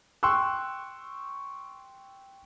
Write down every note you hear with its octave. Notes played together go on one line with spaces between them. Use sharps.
G5 C6 C#6 E6 F#6